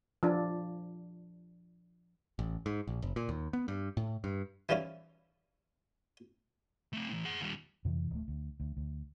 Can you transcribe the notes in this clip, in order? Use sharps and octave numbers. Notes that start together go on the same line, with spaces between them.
F3 D4
A1
G#2
A#1
F#1
A#2
D#2
B3
G2
A2
G2
E3 F3 G3 C#4 E4
A3 C4
A2 E3
G#4 F#5
D#2 G3
F2 C3 E3
D1 A3
D2
D2
D2